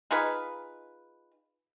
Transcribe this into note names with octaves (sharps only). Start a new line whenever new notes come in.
D#4 F4 G#4 B4